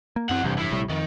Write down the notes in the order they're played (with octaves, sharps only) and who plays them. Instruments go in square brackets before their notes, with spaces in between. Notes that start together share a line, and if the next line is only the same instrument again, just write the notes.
[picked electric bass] A#3
[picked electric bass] F#2 C4 [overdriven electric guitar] E3 F#5
[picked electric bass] F1 G2 E3 [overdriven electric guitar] C2
[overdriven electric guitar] A2 E4
[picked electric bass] A#1 C3 G3
[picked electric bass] F2 [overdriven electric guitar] D#3